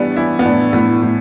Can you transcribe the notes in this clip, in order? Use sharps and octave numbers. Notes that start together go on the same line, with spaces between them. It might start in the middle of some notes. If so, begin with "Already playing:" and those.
Already playing: A2 E3 G3 B3 D4
E3 E4
B3
A2 D4
A2 B3
A2